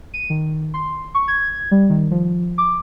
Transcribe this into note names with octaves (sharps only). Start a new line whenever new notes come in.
D#7
D#3
C6
C#6
G#6
G3
D#3
F3
D6